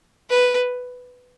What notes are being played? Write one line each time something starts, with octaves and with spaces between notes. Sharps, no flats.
B4